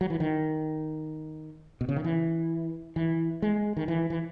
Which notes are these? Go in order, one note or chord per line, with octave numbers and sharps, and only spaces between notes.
F#3
E3
D#3
B2
C#3
D#3
E3
E3
G#3
D#3
E3
E3